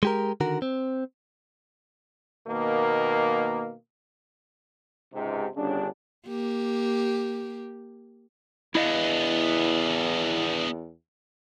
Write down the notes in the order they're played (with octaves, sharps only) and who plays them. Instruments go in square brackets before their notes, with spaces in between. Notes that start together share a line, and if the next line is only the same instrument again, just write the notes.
[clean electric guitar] G#3 G4 A#4
D3 D#3 F#4 A#4
C4
[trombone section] B2 D#3 A#3
[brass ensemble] C#2 G#2 C3
G1 G2 C#3 C#4 D4
[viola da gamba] A#3 G4
[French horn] E2 [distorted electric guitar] B3 D4 [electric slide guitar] E4 D#5 F5